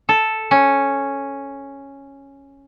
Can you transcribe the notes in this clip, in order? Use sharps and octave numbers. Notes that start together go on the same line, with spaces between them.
A4
C#4